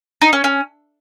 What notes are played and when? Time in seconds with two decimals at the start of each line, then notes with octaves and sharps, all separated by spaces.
0.21 D#4
0.33 C#4
0.44 C#4